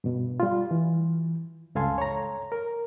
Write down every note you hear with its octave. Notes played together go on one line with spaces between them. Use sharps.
G2 B2
G3 F4
E3
C#2 G2 A4 F5 G#5 C6
C#5 A#5
A#4